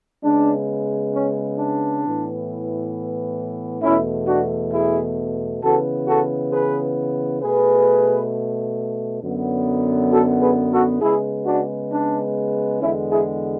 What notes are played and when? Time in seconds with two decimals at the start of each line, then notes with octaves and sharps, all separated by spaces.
0.23 C#3 G#3 B3 D4
1.14 C#4
1.58 D4
2.03 A2 E3 B3
3.82 E2 B2 A3 C#4 E4
4.28 D4 F#4
4.72 E4 G#4
5.62 C#3 E3 B3 F#4 A4
6.07 F#4 A4
6.52 G#4 B4
7.42 B2 A3 G#4 B4
9.22 F#2 D3 F#3 B3
10.11 F#4 A4
10.41 G#4 B4
10.72 F#4 A4
11.01 C#3 G#3 B3 E4 G#4
11.46 D4 F#4
11.92 D4
12.81 E2 D3 G#3 B3 C#4 E4
13.11 E4 G#4